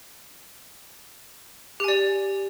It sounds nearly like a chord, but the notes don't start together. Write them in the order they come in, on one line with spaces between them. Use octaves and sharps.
G4 G#5 D5